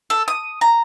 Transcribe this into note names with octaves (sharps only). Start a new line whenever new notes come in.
A4
D#6
A#5